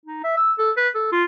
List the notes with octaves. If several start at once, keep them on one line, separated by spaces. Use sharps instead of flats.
D#4
E5
E6
A4
B4
A4
F4